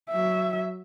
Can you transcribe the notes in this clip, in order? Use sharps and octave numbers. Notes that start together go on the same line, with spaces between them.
F#3 E5